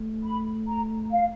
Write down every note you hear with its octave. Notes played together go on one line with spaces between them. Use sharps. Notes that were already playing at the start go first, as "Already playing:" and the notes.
Already playing: A3
B5
A#5
F5